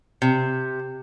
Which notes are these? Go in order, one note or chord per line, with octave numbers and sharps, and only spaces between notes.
C3